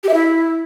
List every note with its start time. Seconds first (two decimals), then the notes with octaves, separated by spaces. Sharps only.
0.03 G4
0.09 E5
0.14 E4